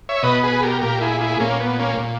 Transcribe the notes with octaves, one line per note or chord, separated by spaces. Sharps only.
C#5 E5
B2 B4 D#5
G#4 B4
G4 A#4
A#2 G4 A#4
E4 G#4
E4 G#4
A#2 A#3 C#4
B3
A#3 C#4
A#2